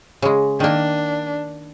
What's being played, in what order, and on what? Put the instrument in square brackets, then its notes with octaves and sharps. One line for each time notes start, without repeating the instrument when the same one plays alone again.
[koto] C#3 G#3
[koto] D#3 A#3 [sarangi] D4